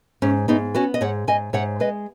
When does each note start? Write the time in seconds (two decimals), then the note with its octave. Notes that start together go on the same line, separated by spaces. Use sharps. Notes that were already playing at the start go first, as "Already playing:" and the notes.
0.22 G#2 C#4
0.48 G#2 B3 D#4
0.74 B3 C#4 F#4
0.94 D#5
1.01 G#2 C#5 F#5
1.27 G#2 D#5 G#5
1.53 G#2 C#5 F#5
1.80 G#3 B4 D#5